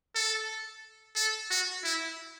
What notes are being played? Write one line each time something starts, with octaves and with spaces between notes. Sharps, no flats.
A4
A4
F#4
E4